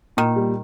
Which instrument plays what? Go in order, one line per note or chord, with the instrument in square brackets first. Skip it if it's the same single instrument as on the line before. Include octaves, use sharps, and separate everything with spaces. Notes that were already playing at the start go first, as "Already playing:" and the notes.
[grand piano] A#2 [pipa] D#3
[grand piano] G3